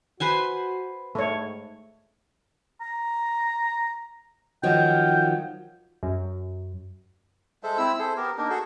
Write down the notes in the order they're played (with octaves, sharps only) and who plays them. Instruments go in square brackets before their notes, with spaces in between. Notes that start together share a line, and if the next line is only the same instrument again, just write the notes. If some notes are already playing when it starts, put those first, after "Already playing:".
[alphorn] F#4 [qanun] B4 C5 G#5
[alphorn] G#2 [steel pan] A3 C#5
[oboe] A#5
[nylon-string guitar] D#3 F3 F#3 [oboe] G5
[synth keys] F#2
[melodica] G#3 A4 C5 E5
C4 E4 E6
G#4 A4 C5
B3 G4 A#4
A#3 D4 D#4 A#4
F#4 G#4 A4